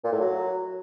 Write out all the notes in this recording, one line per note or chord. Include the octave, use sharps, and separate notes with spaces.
A#2
A2
F#3